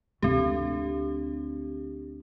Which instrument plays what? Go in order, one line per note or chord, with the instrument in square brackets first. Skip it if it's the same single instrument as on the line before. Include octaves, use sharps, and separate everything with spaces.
[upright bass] D2 D3 [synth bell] C4 G4